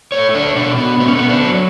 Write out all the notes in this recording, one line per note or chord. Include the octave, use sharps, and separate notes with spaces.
A3 C#5
D4
B2 D4
B3
A3 B3
C#4
B3
D4
F#3